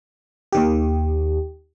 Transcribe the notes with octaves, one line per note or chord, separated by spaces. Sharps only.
D#2 D#3 G4